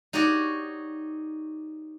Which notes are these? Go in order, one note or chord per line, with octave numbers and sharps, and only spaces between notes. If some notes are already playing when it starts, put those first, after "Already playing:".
D#4 F#4 G4 C#5 D5